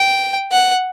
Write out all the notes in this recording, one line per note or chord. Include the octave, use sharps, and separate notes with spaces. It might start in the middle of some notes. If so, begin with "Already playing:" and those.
Already playing: G5
F#5